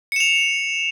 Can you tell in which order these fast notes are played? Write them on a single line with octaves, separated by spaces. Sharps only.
C#7 E7 F7